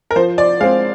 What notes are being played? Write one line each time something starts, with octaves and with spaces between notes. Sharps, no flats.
A#4
F3 C5
D5
G#3 C4 F5